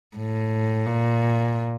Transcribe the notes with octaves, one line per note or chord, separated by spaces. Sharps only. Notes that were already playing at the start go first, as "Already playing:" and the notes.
A2
A#2